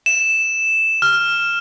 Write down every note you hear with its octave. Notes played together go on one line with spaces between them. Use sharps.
E7
F6